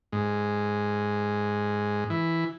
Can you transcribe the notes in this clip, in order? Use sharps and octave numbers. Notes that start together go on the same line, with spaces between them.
G#2
E3